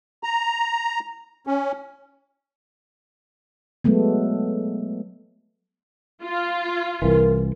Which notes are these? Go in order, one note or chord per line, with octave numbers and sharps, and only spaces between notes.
A#5
C#4
F#3 G#3 A3 B3
F4
C2 E3 A#4